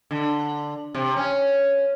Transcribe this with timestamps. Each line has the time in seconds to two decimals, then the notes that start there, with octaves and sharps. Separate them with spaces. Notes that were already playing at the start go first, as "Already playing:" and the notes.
0.11 D3
0.95 C3
1.16 C#4